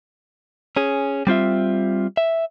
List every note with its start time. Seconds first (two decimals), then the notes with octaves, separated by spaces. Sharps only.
0.77 C#4 G#4
1.27 G3 C4 F4 E5
2.17 E5